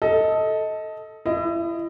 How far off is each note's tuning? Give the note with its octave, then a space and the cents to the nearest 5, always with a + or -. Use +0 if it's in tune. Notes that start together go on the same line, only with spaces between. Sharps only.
A4 +0 D#5 +20
E4 +30 D#5 +0